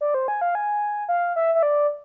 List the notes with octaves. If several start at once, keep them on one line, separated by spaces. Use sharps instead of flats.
D5
C5
G#5
F5
G#5
F5
E5
E5
D5